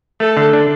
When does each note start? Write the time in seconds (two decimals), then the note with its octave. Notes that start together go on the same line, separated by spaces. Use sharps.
0.20 A3 A4
0.37 D3
0.53 D4